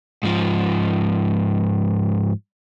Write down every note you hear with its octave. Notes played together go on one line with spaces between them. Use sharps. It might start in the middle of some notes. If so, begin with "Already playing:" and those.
G#2 F3